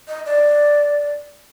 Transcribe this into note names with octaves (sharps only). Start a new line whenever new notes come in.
D#5
D5